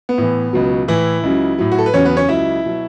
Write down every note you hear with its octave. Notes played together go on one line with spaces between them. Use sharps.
B3
A2 E3
C#2 B2 F#3
A2 E3 E4
C#2 C#3 F#3
A2 F#3
F#4
A4
B4
E2 C#3 F#3 C#4 C#5
B3 B4
C#4 C#5
C#2 C#3 F#3 E4 E5
B2 F#3